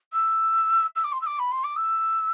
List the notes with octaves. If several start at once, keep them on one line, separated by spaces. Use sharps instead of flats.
E6
E6
D6
C6
E6
D6
B5
C6
D6
E6